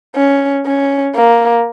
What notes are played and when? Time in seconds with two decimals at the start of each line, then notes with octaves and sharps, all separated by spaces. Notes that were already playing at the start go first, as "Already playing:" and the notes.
0.15 C#4
0.66 C#4
1.15 A#3